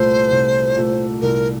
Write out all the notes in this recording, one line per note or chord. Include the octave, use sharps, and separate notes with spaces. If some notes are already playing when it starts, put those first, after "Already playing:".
Already playing: C2 A#2 A3 C5
C2
A#2 A3
C2 A#4